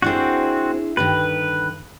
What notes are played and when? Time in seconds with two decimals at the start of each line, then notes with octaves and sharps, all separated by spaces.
0.02 C4 D4 E4 F#4 G#4
0.97 G2 D3 D#3 B4